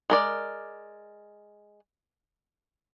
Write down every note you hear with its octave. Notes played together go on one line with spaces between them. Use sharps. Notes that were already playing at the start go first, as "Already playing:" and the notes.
G#3 A#4 D5